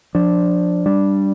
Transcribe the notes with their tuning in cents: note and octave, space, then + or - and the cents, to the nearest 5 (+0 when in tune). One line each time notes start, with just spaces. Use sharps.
F3 +20 D4 +0
G3 +0 D4 +0